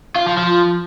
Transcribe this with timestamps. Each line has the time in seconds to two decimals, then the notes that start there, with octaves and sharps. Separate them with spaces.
0.16 F4
0.26 F3
0.37 F3